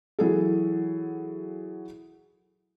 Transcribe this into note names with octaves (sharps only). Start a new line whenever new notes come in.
E3 F#3 G#4 A4